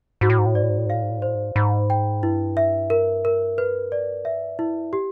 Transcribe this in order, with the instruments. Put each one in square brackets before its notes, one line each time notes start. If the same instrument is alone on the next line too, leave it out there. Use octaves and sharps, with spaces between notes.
[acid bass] G#2 [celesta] F#4
[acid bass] A2
G#2
A2
[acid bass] G#2 [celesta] D5
[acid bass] A2
G#2
A2
G#2
[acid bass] A2 [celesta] F5
[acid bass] G#2
A2
G#2
[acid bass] A2 [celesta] C5
[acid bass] G#2
[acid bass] G#2 [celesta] B5
[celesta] G5
[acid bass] G2 [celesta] E4
[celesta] E5
A#4
A#4
B4
D5
E5
E4
G4